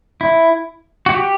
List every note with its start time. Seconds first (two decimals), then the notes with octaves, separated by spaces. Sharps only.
0.21 E4
1.06 F#4
1.14 G4